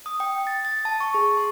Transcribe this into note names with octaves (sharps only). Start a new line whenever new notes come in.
D#6
G5
A6
A6
A5
C#6
G#4
C6